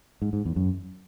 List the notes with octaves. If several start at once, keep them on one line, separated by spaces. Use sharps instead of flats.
G#2
G#2
E2
F#2